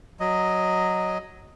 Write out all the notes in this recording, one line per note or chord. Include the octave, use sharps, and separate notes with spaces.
F#3 D#5